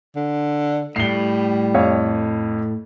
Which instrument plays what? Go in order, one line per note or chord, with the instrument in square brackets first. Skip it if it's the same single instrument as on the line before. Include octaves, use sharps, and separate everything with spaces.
[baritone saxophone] D3
[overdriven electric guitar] A2 [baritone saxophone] G3 [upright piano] C7 G7
[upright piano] F2 C#5 F5